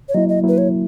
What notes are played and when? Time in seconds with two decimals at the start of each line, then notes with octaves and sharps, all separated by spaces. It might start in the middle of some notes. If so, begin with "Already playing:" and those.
0.09 C#5
0.14 F#3 A#3 E4 D#5
0.29 D#5
0.43 F#3 A#3 E4 B4
0.58 C#5